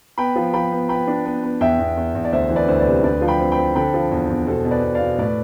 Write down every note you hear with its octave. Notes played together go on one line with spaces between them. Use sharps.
B3 G5 B5
F3
F3 G5 B5
B3
B3 G5 B5
D4
B3
B3
E2 E5 G5
E2
E2
E2
D5
D2 C5 E5
E3
B4 D5
D2 C5
B4 D5
C3
D2 B4 D5
F3
G5 B5
C4
G5 B5
C4
D3 G5 B5
F3
E2
E2
B2 A4 C5
B2
B4 D5
B2
D5 F5
B2
A2 B4 D5